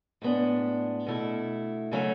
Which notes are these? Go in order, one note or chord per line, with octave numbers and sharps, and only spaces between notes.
A2 G#3 B3 D4
B2 A3 E4
C#3 F#3 A3 C#4